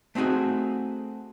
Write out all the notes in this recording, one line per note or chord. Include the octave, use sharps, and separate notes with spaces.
A3 C4 D#4 F#4 G#4